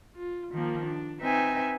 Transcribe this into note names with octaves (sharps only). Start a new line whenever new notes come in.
F4
D#3 F3 A#3
D4
C4 D#4 B4 E5 G5 G#5